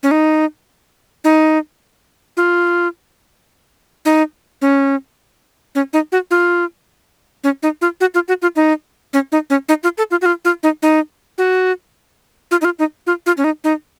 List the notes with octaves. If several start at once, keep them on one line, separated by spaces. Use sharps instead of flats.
C#4
D#4
D#4
F4
D#4
C#4
C#4
D#4
F#4
F4
C#4
D#4
F4
F#4
F4
F#4
F4
D#4
C#4
D#4
C#4
D#4
F4
A4
F4
F#4
F4
F4
D#4
D#4
F#4
F4
D#4
F4
D#4
F4
F4
C#4
D#4
D#4